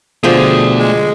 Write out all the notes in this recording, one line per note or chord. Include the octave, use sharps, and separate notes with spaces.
B2 D3 F3 A3 G#4 D5 G5
G#3